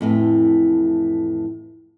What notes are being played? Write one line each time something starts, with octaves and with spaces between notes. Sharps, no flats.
F2 A2 E3